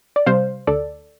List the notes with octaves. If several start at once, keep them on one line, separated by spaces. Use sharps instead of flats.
D5
C3 G3 C5 F5
D2 A4 D5